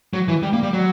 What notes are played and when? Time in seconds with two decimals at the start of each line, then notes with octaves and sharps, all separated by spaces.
0.13 F#3
0.28 E3
0.43 G3
0.53 A#3
0.63 G3
0.73 F#3